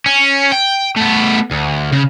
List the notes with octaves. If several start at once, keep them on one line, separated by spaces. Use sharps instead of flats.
C#4
G5
A3 B3
D2
C#3